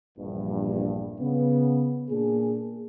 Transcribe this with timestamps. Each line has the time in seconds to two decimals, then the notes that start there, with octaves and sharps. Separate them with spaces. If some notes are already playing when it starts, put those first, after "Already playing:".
0.18 A#1 E2 G2
1.20 C#3 B3
2.10 A#2 A#3 D4 G#4